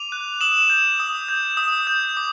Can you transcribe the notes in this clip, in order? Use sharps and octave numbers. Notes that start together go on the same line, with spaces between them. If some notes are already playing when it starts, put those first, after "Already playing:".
Already playing: D6 D#7 F7
F#6
D#6 E7 F#7
G6
D#6
G6
D#6
G6
D6